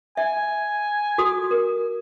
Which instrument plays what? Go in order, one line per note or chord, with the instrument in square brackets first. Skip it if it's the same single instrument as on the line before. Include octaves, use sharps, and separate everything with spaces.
[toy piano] E5 [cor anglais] G#5
[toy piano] F#4 A4 D#6
A#4